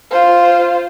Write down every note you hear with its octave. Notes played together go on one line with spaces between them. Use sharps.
F4 C5